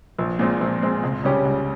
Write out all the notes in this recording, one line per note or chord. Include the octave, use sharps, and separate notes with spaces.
A#1
A#2 G#3 C4
A#1
A#2 G#3 C4
C#2
C#3 G3 C#4 G4
C#2